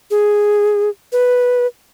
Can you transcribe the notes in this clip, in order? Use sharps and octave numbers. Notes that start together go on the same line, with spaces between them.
G#4
B4